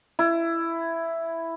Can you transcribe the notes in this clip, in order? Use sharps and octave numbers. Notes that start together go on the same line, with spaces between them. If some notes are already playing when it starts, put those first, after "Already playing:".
E4